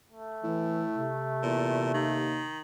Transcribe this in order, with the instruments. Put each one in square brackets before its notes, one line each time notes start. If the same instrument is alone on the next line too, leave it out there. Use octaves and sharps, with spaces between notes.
[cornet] A3
[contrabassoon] A2 [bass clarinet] E3
[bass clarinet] C3
[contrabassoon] E2 [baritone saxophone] A#2
[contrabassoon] D#2 [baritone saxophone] D#3